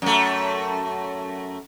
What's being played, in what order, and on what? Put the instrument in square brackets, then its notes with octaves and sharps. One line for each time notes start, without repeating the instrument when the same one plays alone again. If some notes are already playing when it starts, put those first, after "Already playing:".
[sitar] F#2 A3